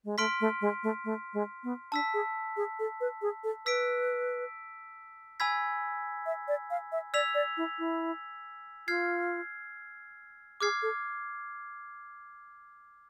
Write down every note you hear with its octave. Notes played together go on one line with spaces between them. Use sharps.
G#3
A3 C6 F6 B6 D7
A3
G#3
A3
A3
G#3
B3
D4 A5 E6 B6
G#4
G#4
A4
B4
G#4
A4
B4 E6 B6 D7
G#5 B5 E6 G#6 B6
E5
D5
F5
E5
D5 E6 G#6 B6 F7
D5
E4
E4
F4 F6 G#6 C7
G#4 D6 F6 G#6 C7
A4